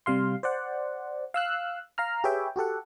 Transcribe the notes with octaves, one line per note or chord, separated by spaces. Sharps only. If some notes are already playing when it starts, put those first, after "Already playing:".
C3 G3 F5 C6
C5 D5 F#5
F5 E6 F#6
F5 A#5 F6
G4 G#4 B4 C#5 E5 G5
F#4 G4 A4 F#5